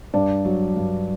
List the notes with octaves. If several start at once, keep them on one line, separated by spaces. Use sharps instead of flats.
G2 D4 D5
F#3
G2